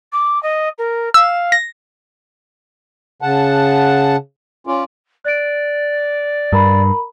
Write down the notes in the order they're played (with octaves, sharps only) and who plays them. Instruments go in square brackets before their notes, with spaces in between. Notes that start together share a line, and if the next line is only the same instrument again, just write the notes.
[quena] D6
D#5
A#4
[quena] F5 [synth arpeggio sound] E6
[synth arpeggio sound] A#6
[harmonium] C#3 F#5 A5
C#4 F4 D5
[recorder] D5 [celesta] F#6 D7
[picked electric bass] G2 [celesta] A#4 A#5 B5